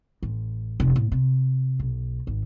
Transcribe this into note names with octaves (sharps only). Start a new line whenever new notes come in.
A1
F1
A2
C3
B1
G#1